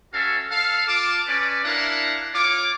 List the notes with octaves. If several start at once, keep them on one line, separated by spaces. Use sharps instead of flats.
C#4 F#4 A4 E5 F5
A4 F5
F4 A5 D6
C#4 B4 D5
D4 E4 A#4 F5 F#5
F4 C#5 D6